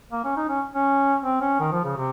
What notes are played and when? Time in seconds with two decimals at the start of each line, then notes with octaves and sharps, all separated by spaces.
0.12 A#3
0.24 C#4
0.36 D#4
0.48 C#4
0.73 C#4
1.23 C4
1.41 C#4
1.59 D#3
1.72 F3
1.84 C#3
1.97 C3